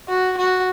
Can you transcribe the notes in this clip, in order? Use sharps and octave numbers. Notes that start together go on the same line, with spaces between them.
F#4
F#4